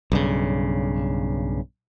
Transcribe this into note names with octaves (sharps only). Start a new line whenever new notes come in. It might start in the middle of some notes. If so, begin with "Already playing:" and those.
B1 G2 C#3